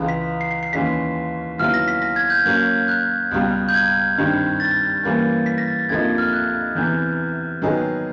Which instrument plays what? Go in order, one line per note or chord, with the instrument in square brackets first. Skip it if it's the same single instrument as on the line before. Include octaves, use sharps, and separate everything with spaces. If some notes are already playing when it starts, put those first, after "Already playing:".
Already playing: [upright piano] C#2 C#3 E3 G#3
[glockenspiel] B6
C7
C7
C7
[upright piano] D#2 C#3 E3 G#3 C#4 [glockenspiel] B6
[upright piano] D#2 C#3 F#3 B3 E4 [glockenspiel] F6
[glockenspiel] A#6
B6
A#6
G#6
G6
[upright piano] F#3 A#3 C#4 [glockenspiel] G6
[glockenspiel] F#6
[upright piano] C#2 B2 G3
[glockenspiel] G6
G#6
[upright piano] G2 D#3 G3 C4
[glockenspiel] A6
[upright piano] E3 G3 A#3 C#4
[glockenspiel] B6
A#6
A6
A#6
[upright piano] D2 C3 F3 A#3 D#4 [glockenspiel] G#6
[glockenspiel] F6
F#6
[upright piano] E2 C3 E3 [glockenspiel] G6
[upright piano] D#3 F#3 B3 D#4 G#4